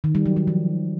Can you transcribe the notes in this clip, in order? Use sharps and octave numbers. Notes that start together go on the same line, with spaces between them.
D#3
G3
F#3
G3
F3